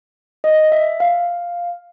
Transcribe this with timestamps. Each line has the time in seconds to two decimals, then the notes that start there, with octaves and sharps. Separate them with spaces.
0.44 D#5
0.72 E5
1.00 F5